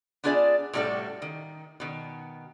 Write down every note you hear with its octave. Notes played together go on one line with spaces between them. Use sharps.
B3 D4 F4 G#4 D5 E5
A2 C3 G3 D#4 F#4 A4
D#3
B2 D#3